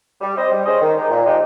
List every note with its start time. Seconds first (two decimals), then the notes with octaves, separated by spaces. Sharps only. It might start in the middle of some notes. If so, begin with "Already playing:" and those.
0.21 G3
0.36 C4 G4 C5 D#5
0.52 G3
0.66 C#4 G#4 C5 D#5
0.81 D#3
0.96 G#3 D#4 G4
1.10 A#2
1.25 F3 G#3 D#4 G4